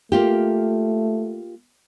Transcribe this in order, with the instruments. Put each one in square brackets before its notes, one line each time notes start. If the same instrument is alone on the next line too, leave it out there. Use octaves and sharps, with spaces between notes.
[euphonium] A3 [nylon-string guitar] A#3 F4 G4